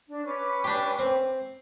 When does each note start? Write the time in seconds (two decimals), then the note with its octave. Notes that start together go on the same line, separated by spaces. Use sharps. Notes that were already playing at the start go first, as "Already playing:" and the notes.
0.08 D4
0.25 C#4 B4 D6
0.64 D4 G4
0.99 C4